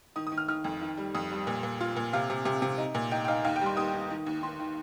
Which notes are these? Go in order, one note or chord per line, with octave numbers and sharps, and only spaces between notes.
D#3 D#6
D#6
D#3
F6
D#3 F6
F2
D#3
G3
F2 D#6
G3
A#2
A#2
F4
A#2
C3 F5
C3
C3
C3
D#4
A#2
D#4 G5
G5
D#4 F5
D#2 F5
G5
G3 C6
D#2 D#6
D#2
D#3
D#2
D#3 C6
D#3